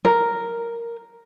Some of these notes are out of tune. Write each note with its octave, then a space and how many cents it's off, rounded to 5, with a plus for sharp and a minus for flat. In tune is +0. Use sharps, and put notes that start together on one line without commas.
A#4 +0